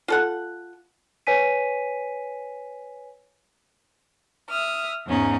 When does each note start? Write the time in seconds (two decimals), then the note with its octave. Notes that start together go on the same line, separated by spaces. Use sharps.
0.08 F4 A4 F#5
1.27 B4 C#5 G#5 B6 D#7
4.49 E5 D#6 F6
5.06 E2 G#2 C#4 D#4